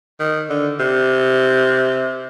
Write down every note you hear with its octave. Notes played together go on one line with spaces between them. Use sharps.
D#3
D3
C3